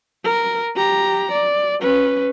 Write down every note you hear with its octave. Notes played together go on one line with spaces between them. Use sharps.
A#4
G4 A#5
D5
C#4 B4